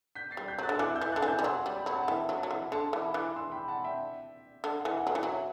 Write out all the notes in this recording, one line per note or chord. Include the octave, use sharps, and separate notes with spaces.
G6 B6
A6 C7
G3
G6 B6
F#3 F#6 A6
D3
E6
E3 D6 F#6
E6 G6
E3
D3 F#6 A6
E3
E6 G6
G3
F#3 C6 E6
G3
G5 B5
F#3
F#5 A5
A5
E3 E5 G5
F#3
F#3 F#5 A5
E3
D3 A5 C6
E3 B5 D6
E3 D6 F#6
C6 E6
G5 B5
F#5 A5
E5 G5
D3
E3 F#5
F#5
F#3
E3 F#5
F#3
E5